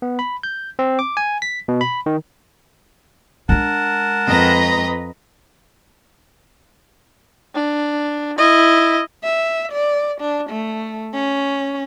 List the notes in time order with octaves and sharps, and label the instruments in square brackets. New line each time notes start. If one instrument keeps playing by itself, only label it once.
[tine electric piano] B3
B5
G6
C4
D6
G#5
B6
B2
B5
D#3
[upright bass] G#3 D4 [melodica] A#4 F#5 A5
[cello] F2 B4 [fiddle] D#5 A#5
[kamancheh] D4
E4 D#5
[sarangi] E5
D5
D4
A3
C#4